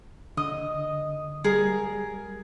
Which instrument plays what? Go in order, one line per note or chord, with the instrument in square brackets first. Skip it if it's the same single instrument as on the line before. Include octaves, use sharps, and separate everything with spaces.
[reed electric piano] D3 D#6 [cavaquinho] D#5
[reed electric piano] G3 [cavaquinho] G#4 A#4